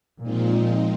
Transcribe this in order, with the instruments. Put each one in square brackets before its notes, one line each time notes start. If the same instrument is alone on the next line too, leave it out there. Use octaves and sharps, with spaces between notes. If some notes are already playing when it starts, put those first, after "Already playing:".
[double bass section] A#2 [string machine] F3 G#3 C4 D#4